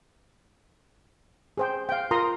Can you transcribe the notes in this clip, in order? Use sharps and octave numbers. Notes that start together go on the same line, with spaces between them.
G#4 C5 G5
F5 G5
F4 A#4 A#5 C6 D#6